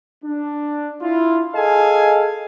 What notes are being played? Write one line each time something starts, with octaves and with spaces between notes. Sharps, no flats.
D4
E4 F4
G#4 A4 D#5 F5 G#5